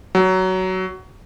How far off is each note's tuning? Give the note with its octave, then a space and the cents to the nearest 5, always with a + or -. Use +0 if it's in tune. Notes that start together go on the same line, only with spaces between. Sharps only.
F#3 +15